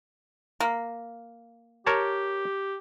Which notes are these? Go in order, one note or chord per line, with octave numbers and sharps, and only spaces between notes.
A#3
G4 A#4 C#5 A5